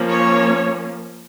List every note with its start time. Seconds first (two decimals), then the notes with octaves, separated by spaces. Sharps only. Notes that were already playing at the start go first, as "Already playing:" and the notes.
Already playing: F3 A#3 C#4
0.10 C#5